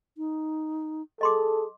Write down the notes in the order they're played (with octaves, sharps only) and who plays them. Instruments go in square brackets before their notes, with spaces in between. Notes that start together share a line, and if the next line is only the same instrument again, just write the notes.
[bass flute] D#4
[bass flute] G#4 [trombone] A4 [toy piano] D#5 C6 D6